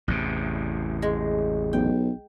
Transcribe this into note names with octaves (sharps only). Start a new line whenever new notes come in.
A1 E2 C3
G#3
B1 G5